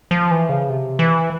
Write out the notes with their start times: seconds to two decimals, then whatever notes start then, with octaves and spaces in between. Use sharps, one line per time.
0.11 F3
0.31 E3
0.49 C#3
0.69 C3
0.99 E3